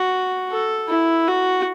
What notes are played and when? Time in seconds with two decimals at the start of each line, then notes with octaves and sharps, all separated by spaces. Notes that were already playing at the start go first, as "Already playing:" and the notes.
Already playing: F#4
0.50 A4
0.89 E4
1.28 F#4